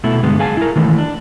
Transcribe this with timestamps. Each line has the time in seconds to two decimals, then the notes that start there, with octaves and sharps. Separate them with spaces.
0.04 B2 A3 E4
0.23 G2 D3 G#3 B3
0.39 G#4 F5 G#5 A5
0.57 E4 A#4
0.76 D#3 E3 A3 E4
0.98 D4